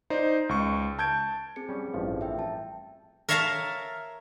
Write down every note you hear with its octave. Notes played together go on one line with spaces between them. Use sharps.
D#4 C5 D5
C#2 C#6
A5 G6 G#6 D7
C4 G#4 C#7
G3 C#4
A1 G2 F3
E5 G5
A5
A#4 C#5 E5 F5 A5 A#5